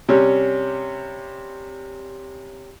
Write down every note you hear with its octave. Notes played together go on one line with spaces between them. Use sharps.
C3 G3 C#4